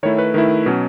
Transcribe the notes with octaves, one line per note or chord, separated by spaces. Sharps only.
D#3 A3 E4 C#5
B4
D#3 A3 E4
B2 F#3 C#4